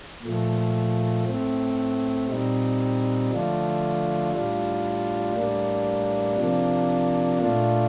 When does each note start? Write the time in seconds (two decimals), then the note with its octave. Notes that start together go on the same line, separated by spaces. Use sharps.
0.23 A#2 F3 A3
1.25 A2 A3 C4
2.28 A#2 G3 C4 D#4
3.30 D3 F3 A3 D4 F4
4.32 A2 G3 D4 F4
5.35 A2 G3 A#3 D4
6.37 C3 F3 A#3 D4
7.40 A#2 A3 D4 F4